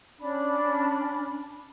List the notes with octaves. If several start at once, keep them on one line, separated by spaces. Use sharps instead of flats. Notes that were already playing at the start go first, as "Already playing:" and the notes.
C#4 D4 B5